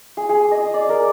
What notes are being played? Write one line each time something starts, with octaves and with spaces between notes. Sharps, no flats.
G#4
G#4
D#5
D5
A#4